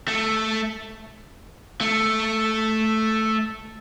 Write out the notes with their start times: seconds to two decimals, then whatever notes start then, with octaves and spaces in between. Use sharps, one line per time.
0.08 A3
1.81 A3